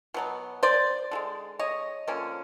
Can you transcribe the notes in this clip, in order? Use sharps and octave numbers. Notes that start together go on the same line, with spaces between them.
B2 F#3 B3
C5 D5
D3 F3 G#3
C#5 D#5
D3 F3 A#3 C#4